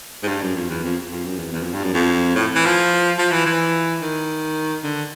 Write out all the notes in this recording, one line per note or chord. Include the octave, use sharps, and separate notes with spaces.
G#2
G2
F#2
F2
E2
F2
F2
F#2
E2
E2
F2
G2
F#2
F2
A2
E3
F3
F3
E3
E3
D#3
D3